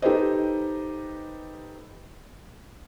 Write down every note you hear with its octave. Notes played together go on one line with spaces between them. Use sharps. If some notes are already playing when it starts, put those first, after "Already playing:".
D#4 G4 A4 B4 C5 D#5